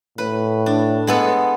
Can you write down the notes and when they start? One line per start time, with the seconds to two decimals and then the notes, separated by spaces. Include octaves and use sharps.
0.18 A2 B4
0.66 D4
1.07 G#3 B3 A4